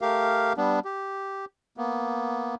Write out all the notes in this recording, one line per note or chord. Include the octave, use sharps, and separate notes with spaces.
A3 G4 A#4 F5
G3 B3 D4
G4
A#3 B3